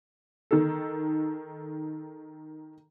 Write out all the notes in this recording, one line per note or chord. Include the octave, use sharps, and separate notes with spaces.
D#3 A4